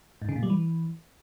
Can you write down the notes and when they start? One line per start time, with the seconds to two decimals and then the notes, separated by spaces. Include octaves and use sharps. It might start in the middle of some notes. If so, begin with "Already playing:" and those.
0.22 G#2
0.29 C#3
0.36 A#2
0.43 G3
0.50 E3